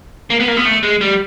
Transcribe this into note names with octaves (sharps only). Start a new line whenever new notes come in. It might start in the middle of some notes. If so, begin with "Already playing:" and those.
A#3
B3
A#3
B3
A3
G#3
G3